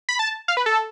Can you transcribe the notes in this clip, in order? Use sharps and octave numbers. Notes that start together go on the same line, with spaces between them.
B5
A5
F5
B4
A4